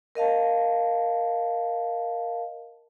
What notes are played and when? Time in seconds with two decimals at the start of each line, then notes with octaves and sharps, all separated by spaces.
0.15 A#4 D#5 F5 A5